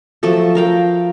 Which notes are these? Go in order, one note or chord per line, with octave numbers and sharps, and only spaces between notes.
F3 F#3 A3 A4
A#4 F5 G5